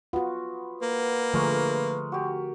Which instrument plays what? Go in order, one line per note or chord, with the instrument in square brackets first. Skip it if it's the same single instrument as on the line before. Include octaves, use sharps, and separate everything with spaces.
[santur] B3 [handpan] F4 F#4
[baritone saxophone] A#3 [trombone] B4
[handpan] D3 F3 A3 [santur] G#3 A#4 C#6
[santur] F#4 G4